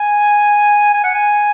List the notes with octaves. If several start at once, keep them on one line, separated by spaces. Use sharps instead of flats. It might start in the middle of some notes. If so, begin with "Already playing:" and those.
Already playing: G#5
G#5
F#5
G#5